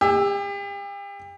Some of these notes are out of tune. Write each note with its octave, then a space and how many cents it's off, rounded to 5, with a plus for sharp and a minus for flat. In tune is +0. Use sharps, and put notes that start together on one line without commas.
G4 +40 G#5 +0 E6 +0